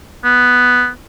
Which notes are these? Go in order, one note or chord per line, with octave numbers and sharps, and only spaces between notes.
B3